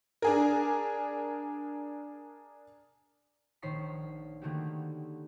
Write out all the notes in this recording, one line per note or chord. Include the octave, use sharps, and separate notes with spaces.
D4 G#4 A#4
A#1 D#3 C5 C#5 B6 C7
D3 D#3 A3 A#3 F#4 G4